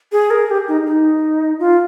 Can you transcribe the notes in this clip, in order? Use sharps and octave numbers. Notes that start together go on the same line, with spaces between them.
G#4
A#4
G4
D#4
D#4
F4